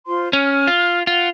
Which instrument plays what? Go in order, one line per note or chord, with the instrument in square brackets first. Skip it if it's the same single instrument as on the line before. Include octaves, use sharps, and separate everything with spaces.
[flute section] F4 C5 C6
[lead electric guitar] C#4 [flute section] F6
[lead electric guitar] F4
[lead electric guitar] F4 [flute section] F#5